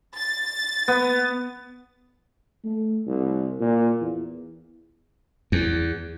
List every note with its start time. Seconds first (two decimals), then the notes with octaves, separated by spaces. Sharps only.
0.17 A6
0.88 B3
2.64 A3
3.07 C2
3.60 A#2
4.01 E2
5.52 E2